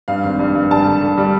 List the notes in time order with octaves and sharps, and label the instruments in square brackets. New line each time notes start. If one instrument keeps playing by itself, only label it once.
[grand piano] G2 F5
G#1
G2
G2
G3 A5
D3
D3
G3